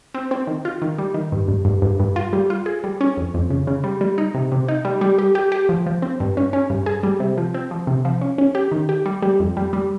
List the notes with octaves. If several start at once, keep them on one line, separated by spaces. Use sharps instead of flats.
C4
C4
D#3
F4
D#3
G3
D#3
G2
G2
G2
G2
G2
F4
G3
F4
G#4
G3
C#4
F2
F2
C#3
C#3
G3
G3
D#4
C3
C3
D#4
G3
G3
G4
G4
G4
F3
F3
C4
G2
C#4
C#4
G2
G#4
G3
C3
F3
C4
F3
C3
F3
C#4
C#4
G4
D#3
G4
G3
G3
F2
G3
G3